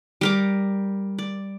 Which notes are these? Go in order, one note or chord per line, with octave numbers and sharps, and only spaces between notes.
G3 A#4 D6
D5